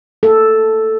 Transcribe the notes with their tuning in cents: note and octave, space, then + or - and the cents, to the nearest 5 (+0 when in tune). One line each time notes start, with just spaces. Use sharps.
A#3 -10 A4 +0